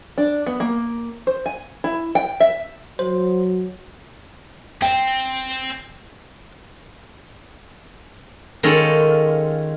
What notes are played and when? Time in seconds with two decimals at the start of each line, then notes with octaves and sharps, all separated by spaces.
0.18 D4
0.46 B3
0.60 A#3
1.27 C5
1.46 G#5
1.84 E4
2.15 G5
2.40 E5
2.99 F#3 C5
4.82 C4 G5
8.63 D#3 G#3 C#4 F4 A4